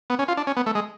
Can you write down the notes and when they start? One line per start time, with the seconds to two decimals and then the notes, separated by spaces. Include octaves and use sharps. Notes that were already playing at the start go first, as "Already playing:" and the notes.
0.10 B3
0.19 C#4
0.28 F4
0.37 D4
0.47 C#4
0.57 B3
0.66 A3
0.75 G#3